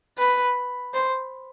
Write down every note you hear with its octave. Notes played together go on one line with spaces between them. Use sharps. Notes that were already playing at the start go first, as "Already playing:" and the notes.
B4
C5